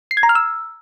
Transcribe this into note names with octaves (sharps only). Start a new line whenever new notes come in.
C7
G#6
A#5
F6
E6